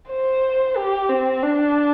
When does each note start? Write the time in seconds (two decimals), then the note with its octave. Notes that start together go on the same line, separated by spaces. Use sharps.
0.10 C5
0.76 G4
1.09 C4
1.43 D4